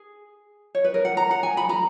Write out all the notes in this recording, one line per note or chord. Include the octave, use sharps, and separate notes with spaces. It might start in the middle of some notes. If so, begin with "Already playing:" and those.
Already playing: G#4
C#5
B4
A#4
F#5
A#5
F#5
G#5
B5
A#5